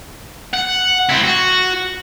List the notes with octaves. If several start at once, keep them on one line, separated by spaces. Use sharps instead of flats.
F#5
C4 E4
F#4